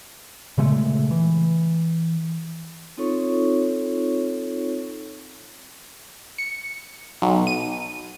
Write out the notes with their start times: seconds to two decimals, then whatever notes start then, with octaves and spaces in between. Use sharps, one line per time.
0.58 A#2 C#3 G#3 A3
1.11 E3
2.98 C4 D#4 F4 A4 C#5 C#6
6.38 C#7
7.22 B1
7.47 D#7